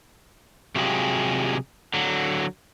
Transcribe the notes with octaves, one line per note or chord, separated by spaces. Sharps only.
C3 F#3 G#3 F4 G4 G#4
D3 F#3